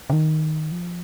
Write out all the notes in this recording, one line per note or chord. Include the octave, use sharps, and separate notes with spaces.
C#3
D#3
F3